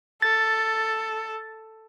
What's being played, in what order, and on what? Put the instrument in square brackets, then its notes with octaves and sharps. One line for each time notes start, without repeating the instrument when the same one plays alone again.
[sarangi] A4 [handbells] A6